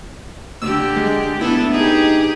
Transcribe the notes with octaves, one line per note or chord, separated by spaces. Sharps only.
D3 G4 E6
G#3
B3 D4 E4 A4
D#4 G4 G#4